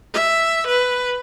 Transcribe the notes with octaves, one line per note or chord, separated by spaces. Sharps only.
E5
B4